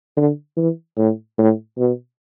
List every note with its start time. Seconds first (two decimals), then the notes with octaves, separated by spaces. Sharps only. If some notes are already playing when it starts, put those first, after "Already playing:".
0.17 D3
0.57 E3
0.97 A2
1.38 A2
1.78 B2